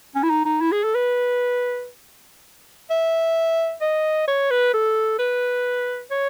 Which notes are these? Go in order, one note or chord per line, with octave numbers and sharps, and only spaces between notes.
C#4
E4
D#4
D#4
E4
G#4
A4
B4
E5
D#5
C#5
B4
A4
B4
C#5